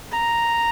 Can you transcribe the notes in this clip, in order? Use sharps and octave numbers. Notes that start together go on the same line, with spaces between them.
A#5